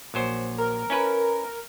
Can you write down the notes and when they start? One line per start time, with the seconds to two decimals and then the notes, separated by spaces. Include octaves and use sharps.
0.14 A#1 F#3 C5
0.58 A#4
0.90 C#4 E4 B4